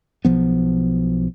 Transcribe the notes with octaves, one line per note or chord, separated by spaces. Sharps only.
B1 F3 B3